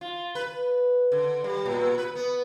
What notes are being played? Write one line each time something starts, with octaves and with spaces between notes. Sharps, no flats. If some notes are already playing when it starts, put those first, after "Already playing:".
F4
B4
D3
G3
A#2
B4
B3